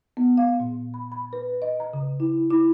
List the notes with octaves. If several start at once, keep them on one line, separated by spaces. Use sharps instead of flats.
B3
F5
A#2
B5
B5
B4
D#5
A#5
C#3
E4
E4